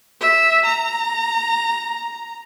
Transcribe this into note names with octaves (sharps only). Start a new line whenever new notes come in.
E5
A#5